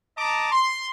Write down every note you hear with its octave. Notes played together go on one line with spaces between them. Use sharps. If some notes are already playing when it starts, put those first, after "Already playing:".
D#5 A5 A#5 D6
C6